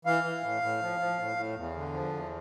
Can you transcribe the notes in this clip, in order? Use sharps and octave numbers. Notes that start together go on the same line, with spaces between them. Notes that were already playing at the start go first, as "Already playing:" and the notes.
E3 F5
E3
A2
A2
F3
F3
A2
A2
E2
D3
F3
E2